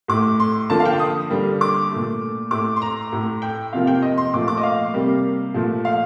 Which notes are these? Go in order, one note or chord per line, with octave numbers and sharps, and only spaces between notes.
A2 A3 D6
C6
D3 F3 A#3 A5
F5
G5
D#6
D3 G3 A#3
D6
A#2 A3
A2 A3 D6
C6
A#5
A2 A3
G5
C3 F3 A#3 F5
G5
D#5
C6
A#2 F3 A3 D6
D6
D#5
F5
C3 G3 A#3
A#2 F3 A3
F5